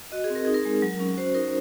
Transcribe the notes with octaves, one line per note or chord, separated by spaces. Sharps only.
F#4 D#5
G#4
C4
A#4
D#4 G#4
A#4
G#3
F#3
C#4
F#4 C5
D#4 A#4